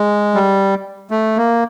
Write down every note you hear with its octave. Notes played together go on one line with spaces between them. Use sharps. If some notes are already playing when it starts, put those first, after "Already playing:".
Already playing: G#3
G3
A3
A#3